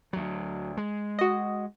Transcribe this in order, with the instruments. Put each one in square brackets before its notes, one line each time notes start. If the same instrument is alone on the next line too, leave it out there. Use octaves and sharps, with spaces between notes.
[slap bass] D2 F#3
G#3
[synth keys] F#4 D#5